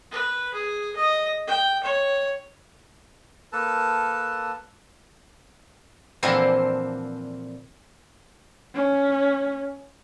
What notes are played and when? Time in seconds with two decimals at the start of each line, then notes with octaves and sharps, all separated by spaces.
0.11 B4
0.54 G#4
0.96 D#5
1.47 G5
1.83 C#5
3.52 A#3 A4 B4 A5
6.23 A#2 D3 E3 F3 A#3 C4
8.75 C#4